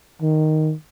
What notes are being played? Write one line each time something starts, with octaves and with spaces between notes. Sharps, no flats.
D#3